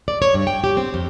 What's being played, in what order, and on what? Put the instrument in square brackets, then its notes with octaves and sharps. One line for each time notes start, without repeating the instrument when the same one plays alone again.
[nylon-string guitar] D5
C#5
G2
G5
G4
C4
F2